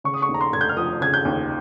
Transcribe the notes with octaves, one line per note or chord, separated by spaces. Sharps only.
C#3 C#6
D#6
C#6
D#2
A#5
C6
F1 G#6
G6
F6
F3 D#6
C#3 G#6
G6
D#2